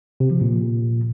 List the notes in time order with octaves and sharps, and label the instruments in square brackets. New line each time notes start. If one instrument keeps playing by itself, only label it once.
[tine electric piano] C3
F3
A#2